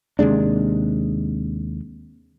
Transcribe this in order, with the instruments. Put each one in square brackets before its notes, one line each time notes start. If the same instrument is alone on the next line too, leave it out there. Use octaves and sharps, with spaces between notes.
[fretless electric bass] D#2 C3 G#3 D4